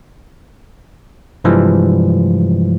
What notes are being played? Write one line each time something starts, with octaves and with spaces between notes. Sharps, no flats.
G2 C3 E3 F3 G3 G#3